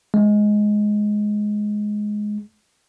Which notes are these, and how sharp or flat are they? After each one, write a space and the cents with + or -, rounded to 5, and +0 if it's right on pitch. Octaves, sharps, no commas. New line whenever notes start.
G#3 +10